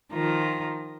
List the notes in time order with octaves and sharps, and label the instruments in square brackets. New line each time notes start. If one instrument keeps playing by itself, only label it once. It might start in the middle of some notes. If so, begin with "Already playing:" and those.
[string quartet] D#3 F3 F4 A#5